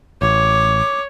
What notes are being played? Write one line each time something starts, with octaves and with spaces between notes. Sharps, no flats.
A1 C#5 D6